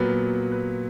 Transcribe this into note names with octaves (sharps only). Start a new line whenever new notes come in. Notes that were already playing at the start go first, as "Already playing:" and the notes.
Already playing: A#2 F#3 B3 B4
B4